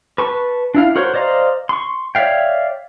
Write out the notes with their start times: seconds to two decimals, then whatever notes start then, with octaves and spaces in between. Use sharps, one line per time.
0.18 B4 A5 C#6
0.75 D4 E4 F5
0.96 F#4 A#4 C5 C#5
1.14 C5 D5 D#5 F5 A#5
1.69 C6 C#6
2.15 C#5 D5 E5 F5 G5